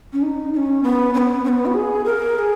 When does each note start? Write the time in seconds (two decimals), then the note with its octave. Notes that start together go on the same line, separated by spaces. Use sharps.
0.13 C#4
0.22 D#4
0.53 D#4
0.57 C#4
0.83 B3
1.14 C#4
1.18 B3
1.44 C#4
1.49 B3
1.66 F#4
1.74 G#4
2.05 A#4
2.35 A#4
2.38 G#4